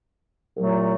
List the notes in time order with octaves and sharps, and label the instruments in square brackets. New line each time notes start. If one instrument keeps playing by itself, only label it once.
[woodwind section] C2 A#2 F#3 A3